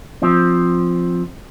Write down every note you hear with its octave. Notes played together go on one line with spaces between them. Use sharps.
F3 C4